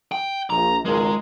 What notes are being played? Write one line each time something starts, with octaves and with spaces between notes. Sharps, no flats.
G5
A#1 A#5
G#1 C#2 G#3 A#4